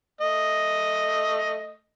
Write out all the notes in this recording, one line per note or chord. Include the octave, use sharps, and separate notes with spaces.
A3 D#5